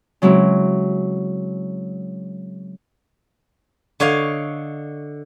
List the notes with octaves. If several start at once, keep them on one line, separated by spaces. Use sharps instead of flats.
C#3 F#3 G#3 C4 E4
D3 C#5 D#5 F5